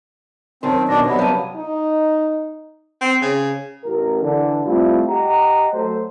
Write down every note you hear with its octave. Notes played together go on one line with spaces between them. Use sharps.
F#2 D#3 C4 C#5 A5 C6
B2 D4 A#6
C3 F#3 B3 C5 D5 B5
F#2 G3 F5 A5 D#7
D#4
C4
C#3
A1 A#4
D3 E3
G3 A3 C4 E4 F4
G4 D#5 F#5 A#5
F#3 A3 A4 C5